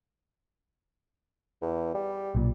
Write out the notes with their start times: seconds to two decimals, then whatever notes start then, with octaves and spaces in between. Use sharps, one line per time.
1.62 E2
1.95 G3
2.35 B1 A#2